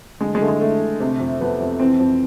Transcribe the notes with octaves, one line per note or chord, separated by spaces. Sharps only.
D3 G#3
G#3
D3 A3
G#3
D3 A3
D3
C3
F2
F2 B3
F2
E3 C4
F2